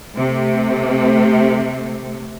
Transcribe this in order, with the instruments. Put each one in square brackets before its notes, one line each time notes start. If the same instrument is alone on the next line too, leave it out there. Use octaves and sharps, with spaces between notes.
[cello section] C3 A3